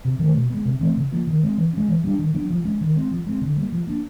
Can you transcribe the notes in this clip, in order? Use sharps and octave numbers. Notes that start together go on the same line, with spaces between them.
C3
D#3 F#3 A3
B2
G#3 B3
C3
E3 A3 C4
C#3
F3 A#3
D#3
G#3 C4
E3
G#3 C#4
E3
G3 B3 D4
D#3
F#3 B3 D4
F3
G#3 C#4
D#3
G#3 C4
F3
G#3 C4
D3
G3 A#3
F3
A#3 D4